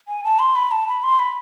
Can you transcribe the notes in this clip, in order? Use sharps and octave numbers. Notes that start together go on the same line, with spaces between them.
G#5
A5
C6
B5
A5
B5
C6
B5